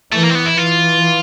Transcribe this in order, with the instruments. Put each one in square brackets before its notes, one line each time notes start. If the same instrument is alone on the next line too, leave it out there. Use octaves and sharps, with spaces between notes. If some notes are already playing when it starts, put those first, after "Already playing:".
[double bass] E3 [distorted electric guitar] A3
[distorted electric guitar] A#3
C4
B3
E4
[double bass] E3 [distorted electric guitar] F4